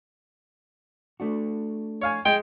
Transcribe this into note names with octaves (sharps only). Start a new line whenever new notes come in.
A3 D4 F#4
C#5 F5 G#5
G#3 G5